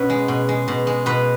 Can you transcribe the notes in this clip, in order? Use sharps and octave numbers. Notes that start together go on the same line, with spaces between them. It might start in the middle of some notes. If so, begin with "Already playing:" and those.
Already playing: B2 C#4 B4
G#3
B2
G#3
B2
G#3
B2 B4